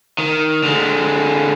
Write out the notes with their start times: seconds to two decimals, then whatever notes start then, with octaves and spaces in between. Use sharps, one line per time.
0.18 D#3
0.63 D3 G#3